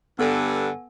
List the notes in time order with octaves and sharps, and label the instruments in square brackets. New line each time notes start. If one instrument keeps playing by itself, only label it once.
[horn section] G2 D3 [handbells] B3 A4 G#5